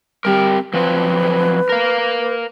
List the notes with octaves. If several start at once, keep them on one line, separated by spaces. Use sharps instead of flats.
G3 C4 A#4
F3 F#3 C4 B4
A#4 F5